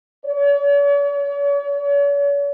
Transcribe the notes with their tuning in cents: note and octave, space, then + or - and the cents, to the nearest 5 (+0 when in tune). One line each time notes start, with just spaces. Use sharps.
C#5 +45